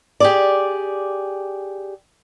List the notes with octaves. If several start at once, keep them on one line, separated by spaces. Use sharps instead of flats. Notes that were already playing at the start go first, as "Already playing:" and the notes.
G4 G#4 D5